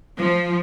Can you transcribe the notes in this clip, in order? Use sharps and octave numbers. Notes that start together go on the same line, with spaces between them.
F3